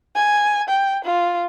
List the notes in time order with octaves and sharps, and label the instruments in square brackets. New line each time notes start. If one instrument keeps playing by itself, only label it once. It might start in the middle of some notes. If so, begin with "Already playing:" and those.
[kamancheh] G#5
G5
F4